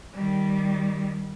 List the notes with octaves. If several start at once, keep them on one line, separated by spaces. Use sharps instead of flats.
D#3 G3